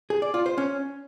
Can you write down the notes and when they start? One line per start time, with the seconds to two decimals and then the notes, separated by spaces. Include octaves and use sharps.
0.10 G#4
0.22 D5
0.34 F4
0.46 C5
0.58 C#4